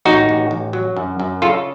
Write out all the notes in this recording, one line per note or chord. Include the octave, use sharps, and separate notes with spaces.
A1 D#4 F#4
A1
A1
F#3
F#2
F#2
C#3 F4 A4